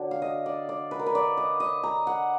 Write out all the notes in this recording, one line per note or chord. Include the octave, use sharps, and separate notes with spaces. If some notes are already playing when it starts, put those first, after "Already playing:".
Already playing: D3 F#3 D4
F5
D#5
D5
D5
B4
A#4
B4
D5
D#5
D#5
A#5
F#5